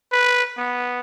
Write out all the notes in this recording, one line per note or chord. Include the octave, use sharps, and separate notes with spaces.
B4
B3